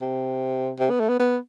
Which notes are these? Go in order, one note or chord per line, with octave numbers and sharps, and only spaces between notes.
C3
C3
B3
A3
B3
B3